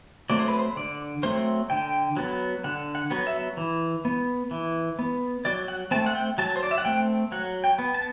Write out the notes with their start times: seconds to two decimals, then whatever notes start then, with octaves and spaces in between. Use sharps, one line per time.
0.30 F#3 A3 C4 D5
0.39 C5
0.48 B4
0.59 C5
0.76 D3 D5
1.23 F#3 A3 C4 C5
1.70 D3 G5
2.17 F#3 B3
2.64 D3 F#5
2.95 F#5
3.10 F#3 B3
3.27 E5
3.57 E3
4.05 B3
4.51 E3
4.99 B3
5.45 F#3 D5
5.68 F#5
5.91 A3 C4 A5
6.06 F#5
6.15 G5
6.38 F#3 A5
6.56 C5
6.63 D5
6.71 E5
6.78 F#5
6.85 A3 C4 G5
7.32 F#3 F#5
7.64 G5
7.78 B3
7.94 A5